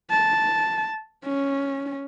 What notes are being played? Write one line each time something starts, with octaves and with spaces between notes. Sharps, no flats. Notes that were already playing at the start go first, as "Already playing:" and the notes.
A5
C#4